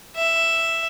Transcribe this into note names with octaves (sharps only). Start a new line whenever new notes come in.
E5